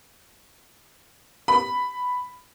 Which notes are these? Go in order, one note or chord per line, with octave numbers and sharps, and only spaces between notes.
B5